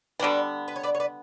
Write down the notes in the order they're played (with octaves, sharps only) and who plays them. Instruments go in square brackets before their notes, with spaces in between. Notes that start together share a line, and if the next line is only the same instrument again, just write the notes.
[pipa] D3 G3 B3 [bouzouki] D4 F#4
[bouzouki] B4
C#5
B4 D5
C#5
B4 D5